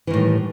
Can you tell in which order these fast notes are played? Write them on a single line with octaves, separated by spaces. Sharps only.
E3 D#3 A2 G3